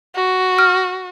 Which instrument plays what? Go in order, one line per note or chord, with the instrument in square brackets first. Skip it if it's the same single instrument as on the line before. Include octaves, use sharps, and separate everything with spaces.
[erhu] F#4
[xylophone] F6